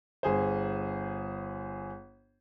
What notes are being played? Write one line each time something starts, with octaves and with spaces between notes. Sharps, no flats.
G1 G#4 C5